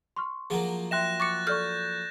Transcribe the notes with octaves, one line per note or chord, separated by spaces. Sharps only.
C6 C#6 F6
F3 F#3 A#3 G#4
E5 G5 C6 F#6 A#6 E7
C#6 D6 A6 C#7
A4 D5 C#6 F6 G6